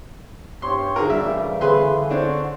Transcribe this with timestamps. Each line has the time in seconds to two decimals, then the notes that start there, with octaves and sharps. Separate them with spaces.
0.62 G2 G4 C#5 C6 C#6
0.96 D3 F#4 G#4 A#4
1.10 C#3 E3 G3 A3 E5
1.61 D3 G#4 B4 C6
2.10 C4 D4 C5 C#5 F#5